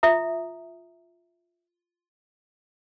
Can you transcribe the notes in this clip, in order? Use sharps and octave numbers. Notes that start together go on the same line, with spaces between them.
F4 E5 A#5 D#6